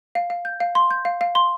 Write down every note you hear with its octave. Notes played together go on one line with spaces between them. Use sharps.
F5
F5
G6
F5
C6
G6
F5
F5
C6